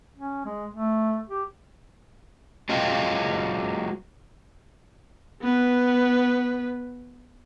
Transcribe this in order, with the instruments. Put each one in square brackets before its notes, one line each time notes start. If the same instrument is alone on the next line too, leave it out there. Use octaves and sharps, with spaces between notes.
[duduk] C#4
G#3
A3
G4
[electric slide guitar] F#3 G#3 F4 D#5 F5 G5
[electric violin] B3 B4